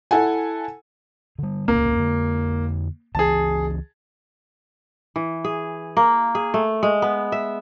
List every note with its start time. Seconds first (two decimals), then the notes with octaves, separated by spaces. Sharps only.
0.11 E4 A4 F#5 G#5
1.39 D3 G3
1.68 D#1 C#2 A#3 C#4
1.96 F2 D3
3.15 C#2 E3 G#4 A5
5.16 E3
5.45 G#4
5.97 A#3
6.35 G#4
6.54 A3
6.83 G#3
7.02 B3
7.32 E5